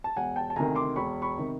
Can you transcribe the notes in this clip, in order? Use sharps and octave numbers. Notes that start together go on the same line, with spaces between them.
A5
E1 F#5 G#5
G5 A5
A5
D2 C3 D#3 G#5 A#5
C6 D6
E1 B5 C#6
B5 C#6
C3 D#3